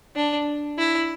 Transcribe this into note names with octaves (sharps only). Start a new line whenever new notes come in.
D4
E4